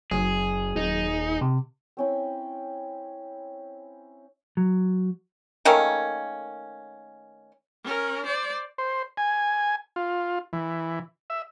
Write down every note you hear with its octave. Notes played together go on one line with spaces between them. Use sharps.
F#1 F#3 G#4
D#1 D#4
C3
C4 C#4 E4
F#3
D#3 A3 A#3 C#4
C#4 A#4
C5 D5
C5
G#5
F4
E3
E5